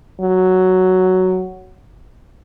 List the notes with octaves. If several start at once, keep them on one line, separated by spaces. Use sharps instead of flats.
F#3